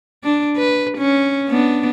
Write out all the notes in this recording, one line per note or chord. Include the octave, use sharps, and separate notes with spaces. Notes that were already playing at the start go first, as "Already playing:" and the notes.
D4
B4
C#4
B3 D4